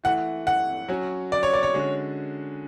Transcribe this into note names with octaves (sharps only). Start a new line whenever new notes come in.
E3 A3 E4 F#5
F#5
F#3 C#4 F#4
D5
C#5
D5
C#5
D3 G#3 C#4 F#4